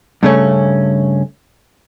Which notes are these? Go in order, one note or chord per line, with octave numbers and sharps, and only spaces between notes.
G2 C#3 A3 C#4